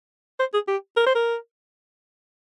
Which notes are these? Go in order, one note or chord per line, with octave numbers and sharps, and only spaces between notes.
C5
G#4
G4
A#4
C5
A#4